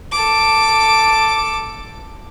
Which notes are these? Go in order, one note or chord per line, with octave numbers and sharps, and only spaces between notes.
A4 D6